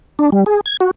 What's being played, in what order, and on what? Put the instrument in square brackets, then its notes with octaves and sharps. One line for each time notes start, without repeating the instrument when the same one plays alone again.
[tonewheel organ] D4
G3
G#4
G#6
F#4